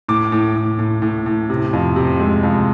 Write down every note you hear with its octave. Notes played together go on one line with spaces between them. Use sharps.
A2 D6
A2
A2
A2
A2
A2
C3
F2
C3
G#3
F2